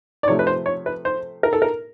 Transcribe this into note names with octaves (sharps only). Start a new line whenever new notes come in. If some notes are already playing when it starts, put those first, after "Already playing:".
D5
C3 F3 A3 C#5
B4
C5
C#5
B4
C5
A#4
A4
A#4